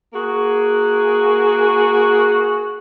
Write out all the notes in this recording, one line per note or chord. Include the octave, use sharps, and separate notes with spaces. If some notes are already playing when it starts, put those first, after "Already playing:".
A#3 F#4 G#4